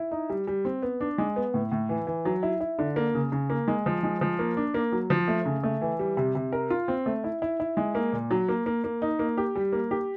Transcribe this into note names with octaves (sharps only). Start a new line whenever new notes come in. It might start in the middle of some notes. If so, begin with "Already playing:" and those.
Already playing: E4
D#4
G3
G3
C4
B3
D4
G#3
B3
A2
A2
E3
E3
F#3
E4
E4
D3
A#3
C#3
C#3
A#3
G#3
F3
G#3
F3
A#3
D4
A#3
F#3
F3
A3
C#3
A3
E3
G3
C3
C3
A#4
F4
C4
A3
E4
E4
E4
G#3
A#3
A#2
F#3
A#3
A#3
A#3
D#4
A#3
G4
G3
A#3
G4